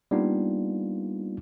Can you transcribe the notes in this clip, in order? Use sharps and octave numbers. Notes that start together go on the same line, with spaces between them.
G3 A#3 B3 D4 D#4 F4